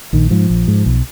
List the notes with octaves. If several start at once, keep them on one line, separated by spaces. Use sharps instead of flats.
A#1 D#3
G#2 F3
A#1
G#2
B1